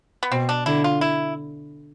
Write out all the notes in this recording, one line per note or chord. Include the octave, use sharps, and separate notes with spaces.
B3
B2 C4
D4
D3 E4
F4
E4